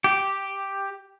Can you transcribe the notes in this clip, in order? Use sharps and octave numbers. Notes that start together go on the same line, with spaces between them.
G4